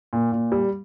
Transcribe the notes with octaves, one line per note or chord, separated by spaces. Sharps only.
A#2
A#2
G3